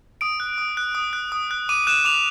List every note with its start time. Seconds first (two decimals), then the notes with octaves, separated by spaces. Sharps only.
0.21 D#6 D7
0.40 F#6
0.58 D#6
0.77 F#6
0.95 D#6
1.13 F#6
1.32 D#6
1.51 F#6
1.69 D6 D#7
1.87 F#6 E7
2.05 D6 F7